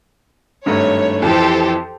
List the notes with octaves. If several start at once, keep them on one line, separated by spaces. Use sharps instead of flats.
G#1 G2 A3 C#5
F2 E3 G4 A4 C5